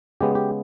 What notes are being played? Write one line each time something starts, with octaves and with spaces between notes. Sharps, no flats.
C#3 G#3 B3 G4
G4